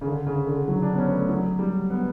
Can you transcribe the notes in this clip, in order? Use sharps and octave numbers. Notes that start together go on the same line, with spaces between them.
C#3
D3
C#3
D3
F#3
D4
B3
C#4
A3
F#3
G3
B3